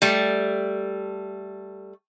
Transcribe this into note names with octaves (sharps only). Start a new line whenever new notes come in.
G3 A3